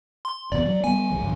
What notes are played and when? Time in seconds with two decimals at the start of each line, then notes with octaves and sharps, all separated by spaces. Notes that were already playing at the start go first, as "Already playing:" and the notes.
0.25 C6
0.52 F1 E2 B2 D5
0.65 F#3
0.84 G3 B3 G#5
1.10 A#1 F3 G#3
1.22 G#1 C#2 F#2